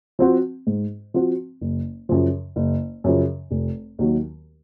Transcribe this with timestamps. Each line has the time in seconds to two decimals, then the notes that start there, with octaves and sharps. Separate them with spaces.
0.19 F3 C4 F#4
0.67 G#2
1.14 F3 C4 F#4
1.61 F#1
2.09 F#2 C#3 F3
2.56 F#1
3.04 F#2 C#3 F3
3.51 F1
3.99 D#2 D#3 F#3